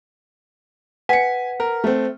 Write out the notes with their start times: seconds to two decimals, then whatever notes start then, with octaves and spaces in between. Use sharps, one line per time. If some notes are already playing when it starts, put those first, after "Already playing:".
1.09 B4 F#5 G#5 B6 C#7
1.60 A#4
1.84 A3 C4